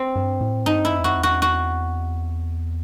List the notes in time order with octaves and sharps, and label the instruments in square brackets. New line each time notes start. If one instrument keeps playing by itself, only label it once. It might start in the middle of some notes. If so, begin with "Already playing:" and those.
Already playing: [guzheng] C4
[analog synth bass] G2
A2
[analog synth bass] G2 [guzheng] D#4
[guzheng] E4
[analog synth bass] F#2
E2
[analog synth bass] F#2 [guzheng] F#4
[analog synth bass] E2
[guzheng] F#4
F#4